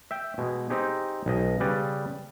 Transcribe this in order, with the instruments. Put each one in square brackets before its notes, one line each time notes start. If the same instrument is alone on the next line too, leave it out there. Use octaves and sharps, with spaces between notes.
[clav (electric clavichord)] E5 G5
B2 G#3
C4 D#4 G4 G#4
B1 D#5
C#3 G3 B4 D5